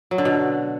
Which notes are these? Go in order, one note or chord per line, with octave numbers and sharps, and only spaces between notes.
F#3
D3
B2